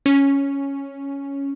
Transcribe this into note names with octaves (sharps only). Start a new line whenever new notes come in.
C#4